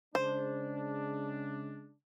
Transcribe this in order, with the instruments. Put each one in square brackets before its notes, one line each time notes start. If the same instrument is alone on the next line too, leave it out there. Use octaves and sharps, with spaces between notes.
[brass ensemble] C#3 G#3 D4 [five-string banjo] C5